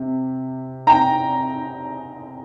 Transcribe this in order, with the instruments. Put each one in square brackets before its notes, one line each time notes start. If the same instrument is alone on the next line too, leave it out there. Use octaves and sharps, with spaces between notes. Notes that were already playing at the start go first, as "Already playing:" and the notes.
Already playing: [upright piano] C3
G5 A#5